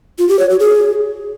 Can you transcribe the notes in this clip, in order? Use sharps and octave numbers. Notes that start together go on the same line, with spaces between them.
F4
G4
C#5
F#4
G#4